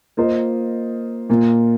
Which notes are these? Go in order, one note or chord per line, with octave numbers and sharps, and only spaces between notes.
A#3 F4 C5 D#5
A#2 A#3 F4